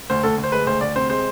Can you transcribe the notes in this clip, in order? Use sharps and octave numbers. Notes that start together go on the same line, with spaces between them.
D2 C5
D2 A4
D2
C5
G#3 B4
D2 C5
D2 D5
C3 C5
G#3 C5